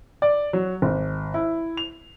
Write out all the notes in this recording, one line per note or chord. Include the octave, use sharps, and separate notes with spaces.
D5
F#3
G#1
E4
F7